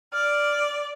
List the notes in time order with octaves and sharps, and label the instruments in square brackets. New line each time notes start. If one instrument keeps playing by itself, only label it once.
[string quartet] D5 [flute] F6